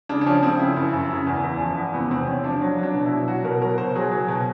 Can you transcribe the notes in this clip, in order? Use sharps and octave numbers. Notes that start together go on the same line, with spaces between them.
C#3 D4
D4
F3 C#4
C#3 C4
C#3 E4
F#2
F#2
C#3
E2
E2
F3
E2
C3 B3
E2 C4
C3 C#4
F3 D4
F#3 C#4
F#3 D4
B2
E4
B2
F#3 F#4
B2 A#4
F#3 A#4
B2 C5
F#3 G#4
F#3
B2